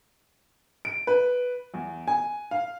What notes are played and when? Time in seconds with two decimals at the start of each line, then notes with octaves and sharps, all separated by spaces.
0.85 D7
1.07 B4
1.74 E2
2.08 G#5
2.51 F5